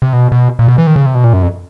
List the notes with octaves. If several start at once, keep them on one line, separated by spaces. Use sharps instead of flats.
C3
B2
B2
A#2
B2
E3
D#3
C#3
C3
B2
A#2
F#2
F2